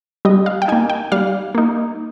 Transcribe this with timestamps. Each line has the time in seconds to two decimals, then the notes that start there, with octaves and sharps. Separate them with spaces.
0.25 G3 D#5
0.46 F5
0.62 G5
0.68 A#3 D#4 G#5
0.90 G5
1.12 G3 F5
1.55 A#3 D#4